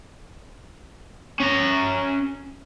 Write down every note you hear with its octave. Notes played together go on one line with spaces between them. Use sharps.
C#4 A#5